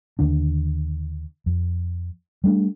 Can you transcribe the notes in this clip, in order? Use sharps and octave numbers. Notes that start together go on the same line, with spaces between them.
D#2 D3 D4
F2
G3 A3 A#3 D4